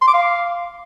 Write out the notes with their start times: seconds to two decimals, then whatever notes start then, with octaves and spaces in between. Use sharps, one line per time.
0.02 C6
0.08 D6
0.14 F5